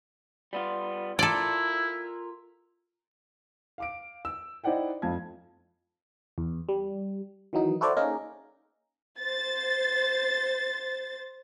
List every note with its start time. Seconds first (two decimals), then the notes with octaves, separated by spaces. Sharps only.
0.53 G3 B3 F4
1.19 E4 F4 A4 A#4 D5
3.78 F5 D6 D7
4.25 E6
4.64 D#4 E4 C5 D5 F#5 G5
5.02 F2 F4 A5 G#6
6.38 E2
6.69 G3
7.53 D#3 E3 F#3 D#4
7.81 E4 F#4 A4 C5 D5
7.97 A#3 C#4 D#4 G#4 A#4
9.20 C5 A6